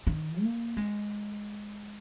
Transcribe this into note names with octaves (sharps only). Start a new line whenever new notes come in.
D#3
A#3
G#3